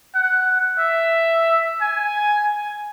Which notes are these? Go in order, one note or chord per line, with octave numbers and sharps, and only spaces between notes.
F#5
E5
G#5